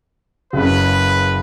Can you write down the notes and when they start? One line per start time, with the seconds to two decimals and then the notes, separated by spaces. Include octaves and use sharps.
0.53 F#1 C#3 B4